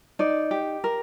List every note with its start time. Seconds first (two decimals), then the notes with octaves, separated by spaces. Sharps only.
0.19 D#4 D5
0.51 G4
0.84 A#4